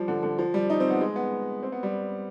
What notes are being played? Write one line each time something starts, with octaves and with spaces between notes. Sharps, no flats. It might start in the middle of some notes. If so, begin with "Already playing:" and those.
Already playing: F3 G3
D3
D3
F3
G3
D#4
C4
B3
G#3
B3
C4
B3
G3